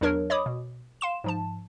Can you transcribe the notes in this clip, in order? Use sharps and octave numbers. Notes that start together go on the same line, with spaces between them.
E2 F#3 D4 A#4 C#5
C#5 D#5 B5 D6 D#6
B2
F5 C6 E7
G#2 F3 A5